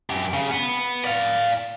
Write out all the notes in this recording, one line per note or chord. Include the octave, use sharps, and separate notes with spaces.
F#2 G4
C#3
B3
D5 F5